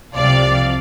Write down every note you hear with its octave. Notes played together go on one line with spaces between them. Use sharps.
C2 C3 F3 D5 F5